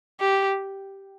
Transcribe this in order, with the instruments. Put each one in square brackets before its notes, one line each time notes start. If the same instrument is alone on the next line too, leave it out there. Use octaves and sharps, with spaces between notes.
[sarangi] G4